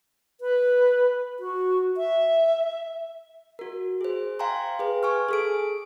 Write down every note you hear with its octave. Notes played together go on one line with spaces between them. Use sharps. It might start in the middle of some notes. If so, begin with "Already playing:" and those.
B4
F#4
E5
F#4 A#4
G#4 C5
F5 G5 G#5 A#5 C6
G#4 B4
G#5 C#6 F6
G#4 A4 D7